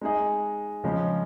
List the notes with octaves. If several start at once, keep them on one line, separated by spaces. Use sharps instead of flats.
G#3 D#4 G#4 D#5
C#3 F3 G#3 C#4